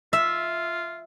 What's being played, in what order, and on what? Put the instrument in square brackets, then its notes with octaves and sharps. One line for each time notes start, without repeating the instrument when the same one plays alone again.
[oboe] F4 [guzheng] E5